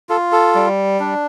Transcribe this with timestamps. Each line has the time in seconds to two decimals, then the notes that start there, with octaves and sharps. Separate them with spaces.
0.09 F4 A4
0.32 A4
0.55 G3
1.00 D4